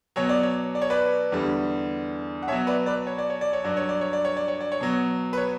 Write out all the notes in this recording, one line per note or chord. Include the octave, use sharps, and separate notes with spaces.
B2 F#3 C#5
D5
C#5
D5
C#5
B4 D5
E2 D3 G3
F#5
B2 F#3 C#5 E5
B4 D5
B4 D5
C#5
D5
C#5
D5
C#5
G2 F#3 D5
C#5
D5
C#5
D5
C#5
D5
C#5
D5
C#5
B2 F#3
B4
C#5